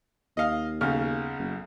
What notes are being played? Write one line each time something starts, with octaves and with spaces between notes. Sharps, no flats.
D#2 D#5 F5
B1 C#3 F6
F#1